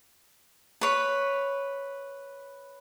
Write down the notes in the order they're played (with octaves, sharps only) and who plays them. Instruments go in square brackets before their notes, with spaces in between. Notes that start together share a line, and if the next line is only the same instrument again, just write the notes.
[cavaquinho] B4 C#5